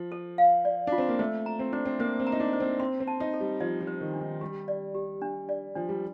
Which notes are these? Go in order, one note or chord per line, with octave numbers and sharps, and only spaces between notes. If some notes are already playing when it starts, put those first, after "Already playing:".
Already playing: F3
A4
F5
D5
D4 F4
C4
A#3
A3 C5
A#5
C4
D4 C5
C4
A#3 C5
C4
A#5
D#4
D4
C5
C4
C4 C6
C4
A5
D#4
A4
G3
F3 D#5
F3
C5
D#3
D4
D#3
G3 G4
D5
G4
D4
D5
F3 D4
G3